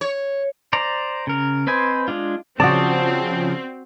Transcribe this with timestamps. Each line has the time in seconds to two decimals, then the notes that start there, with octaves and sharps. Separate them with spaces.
0.01 C#5
0.73 C5 D5 A#5
1.27 C#3 A#4
1.67 C4 B4 C5 D#5 G#5
2.08 G#3 D4 F4
2.60 C#3 F3 C4 F#4 D5 A5 D#6